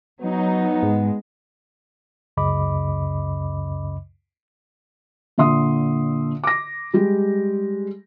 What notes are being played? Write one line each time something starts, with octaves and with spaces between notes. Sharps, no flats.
F#3 B3 D#4
G#2 G#3
C#2 F#2 C#3 D#5 B5 D6
A#2 D3 E5 C6 D#6
D6 A#6
G3 G#3 G4